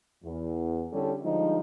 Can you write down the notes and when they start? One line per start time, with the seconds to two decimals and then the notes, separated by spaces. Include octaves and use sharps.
0.24 E2
0.93 D3 G3 C#4 E4 G4 A4
1.23 D3 F3 G3 G#3 D#4